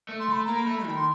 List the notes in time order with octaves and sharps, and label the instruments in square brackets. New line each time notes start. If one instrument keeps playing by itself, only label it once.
[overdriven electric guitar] A3
[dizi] C6
[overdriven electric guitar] A3 [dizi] B5
[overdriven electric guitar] A#3 [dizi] A#5
[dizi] B5
[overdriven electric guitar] A3
D#3
[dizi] C6